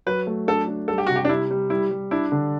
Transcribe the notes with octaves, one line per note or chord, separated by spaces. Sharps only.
F#3 B4
A3
D4 A4
D4
G3 A4
G4
C3 F#4
G4
D4
G3 E4
G3
G3 E4
G3
D4 E4
D3